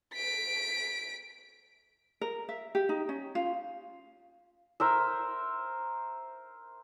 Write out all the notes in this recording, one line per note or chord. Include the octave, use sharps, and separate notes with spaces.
B6 D7
A#4
E5
G4
D#4
C#4
F4
A#4 C5 E5